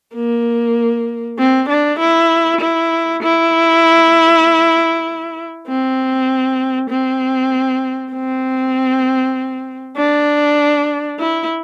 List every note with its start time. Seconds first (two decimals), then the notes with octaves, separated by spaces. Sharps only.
0.15 A#3
1.38 C4
1.69 D4
1.99 E4
2.61 E4
3.23 E4
5.68 C4
6.90 C4
8.13 C4
9.97 D4
11.19 E4